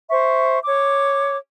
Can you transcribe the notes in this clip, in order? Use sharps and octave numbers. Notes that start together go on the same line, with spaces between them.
C5 E5 C#6
C#5 D6